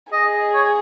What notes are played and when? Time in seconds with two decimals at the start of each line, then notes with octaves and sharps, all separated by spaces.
0.12 G#4 D#5
0.54 C#5